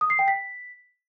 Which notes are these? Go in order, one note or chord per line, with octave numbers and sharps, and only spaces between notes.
D#6
C7
G5
B6